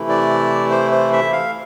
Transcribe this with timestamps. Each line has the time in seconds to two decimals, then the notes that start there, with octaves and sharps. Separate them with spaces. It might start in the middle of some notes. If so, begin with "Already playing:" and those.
Already playing: C3 E3 A3 E4
0.09 D5
0.71 C5
0.91 C5
1.13 E5
1.32 F5